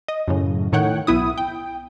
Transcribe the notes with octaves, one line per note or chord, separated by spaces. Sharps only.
D#5
F#2 A2 C#3
A2 D#3 C#5 F#5 G5
B1 B3 E4 D#6
G5